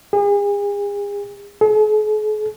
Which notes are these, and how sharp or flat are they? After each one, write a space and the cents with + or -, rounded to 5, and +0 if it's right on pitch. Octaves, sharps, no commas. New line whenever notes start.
G#4 -40
G#4 +45